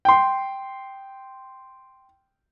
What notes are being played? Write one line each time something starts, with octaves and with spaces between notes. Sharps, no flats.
G5 C6